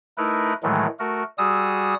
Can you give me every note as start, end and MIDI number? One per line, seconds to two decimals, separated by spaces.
0.18 0.53 57
0.18 0.53 63
0.18 0.53 64
0.18 0.53 70
0.18 0.53 71
0.63 0.86 45
0.63 0.86 51
0.63 0.86 52
0.63 0.86 54
0.63 0.86 56
0.63 0.86 57
0.99 1.23 57
0.99 1.23 66
0.99 1.23 70
1.38 1.94 55
1.38 1.94 66
1.38 1.94 68
1.38 1.94 87
1.38 1.94 88